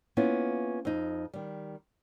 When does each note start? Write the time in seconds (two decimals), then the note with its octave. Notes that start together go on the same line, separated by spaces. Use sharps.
0.17 A#3 B3 C#4 E4 F4
0.85 F2 D#4
1.34 D#3 G3